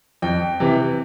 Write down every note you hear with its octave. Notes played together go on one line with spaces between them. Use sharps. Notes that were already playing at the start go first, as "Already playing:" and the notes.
F2 G5
C3 E3